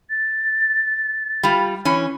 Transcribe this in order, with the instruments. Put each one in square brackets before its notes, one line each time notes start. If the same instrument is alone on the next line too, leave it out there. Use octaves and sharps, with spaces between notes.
[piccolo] A6
[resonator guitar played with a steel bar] G3 F4
E3 C#4